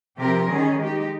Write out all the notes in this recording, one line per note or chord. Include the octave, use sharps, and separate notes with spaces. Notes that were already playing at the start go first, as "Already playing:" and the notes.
C3 F3 C4 G4 A#4
D#3 G3 C#4 G#4
G#3 D#4 G4